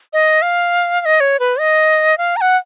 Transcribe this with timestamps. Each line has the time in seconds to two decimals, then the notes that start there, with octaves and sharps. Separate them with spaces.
0.13 D#5
0.42 F5
1.01 F5
1.05 D#5
1.20 C#5
1.40 B4
1.59 D#5
2.18 F5
2.36 A#5
2.41 F#5